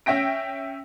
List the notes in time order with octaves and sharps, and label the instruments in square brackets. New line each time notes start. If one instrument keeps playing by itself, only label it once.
[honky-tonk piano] C#4 E5 G5 A#6 D7